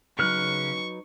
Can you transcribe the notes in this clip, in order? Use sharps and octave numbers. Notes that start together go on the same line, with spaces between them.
C#3 F#3 D#4 B4 C#6 F6 F#6